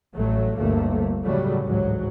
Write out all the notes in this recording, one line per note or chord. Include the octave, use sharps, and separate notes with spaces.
A1 F#3 A3
G1 D2 A#2 A3 A#3
A2 C#3 F#3 G3 A3
A1 D2 G#2 F#3